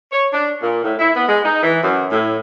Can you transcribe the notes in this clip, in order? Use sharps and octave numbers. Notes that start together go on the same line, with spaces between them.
C#5
D4
A#2
A2
E4
B3
G#3
D#4
E3
F#2
A2